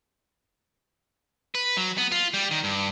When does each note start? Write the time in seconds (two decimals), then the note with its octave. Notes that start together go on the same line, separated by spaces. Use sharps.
1.55 B4
1.77 F#3
1.98 B3
2.12 F4
2.34 G3
2.51 D#3
2.64 G2